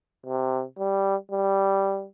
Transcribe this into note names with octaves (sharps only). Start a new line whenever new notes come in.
C3
G3
G3